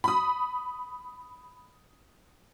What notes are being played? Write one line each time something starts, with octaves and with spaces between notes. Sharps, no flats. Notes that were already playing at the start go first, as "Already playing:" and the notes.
B5 D#6